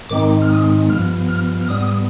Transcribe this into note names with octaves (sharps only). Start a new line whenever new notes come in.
G#2 D#3 G#3 C4 D#4 D6
F6
D#6
G2 F3 B3 F6
F6
F6
G#2 G3 B3 D#6